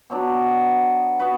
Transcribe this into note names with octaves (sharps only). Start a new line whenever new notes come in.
B2 F#3 B3 D4
B3 F#4 B4